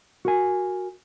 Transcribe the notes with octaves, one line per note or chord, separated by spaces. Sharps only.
F#4 A#4 G#5